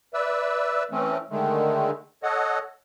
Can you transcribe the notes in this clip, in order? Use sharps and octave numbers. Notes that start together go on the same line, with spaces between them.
B4 D5 E5 E6
E3 A3 C4 C#4
D3 D#3 G#3 A3
A4 C#5 D#5 F#5